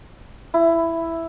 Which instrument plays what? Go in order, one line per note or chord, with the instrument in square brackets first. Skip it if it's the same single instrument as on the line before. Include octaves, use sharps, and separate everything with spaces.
[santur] E4